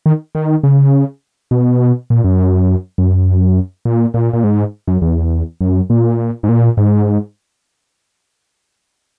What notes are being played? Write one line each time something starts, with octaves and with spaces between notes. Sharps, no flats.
D#3
D#3
C#3
B2
A#2
F#2
F#2
A#2
A#2
A#2
G#2
F#2
E2
F#2
A#2
G#2
A#2
G#2